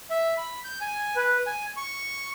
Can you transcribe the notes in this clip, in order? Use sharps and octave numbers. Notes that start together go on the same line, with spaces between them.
E5
B5
G6
G#5
B4
G#5
C#6